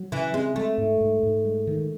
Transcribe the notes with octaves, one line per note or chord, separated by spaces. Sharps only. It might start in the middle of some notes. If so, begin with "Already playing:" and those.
Already playing: F#3
C#3 E3
G#3 C4
G#3 A3
G#2
G#2
G#2
G#3
D#3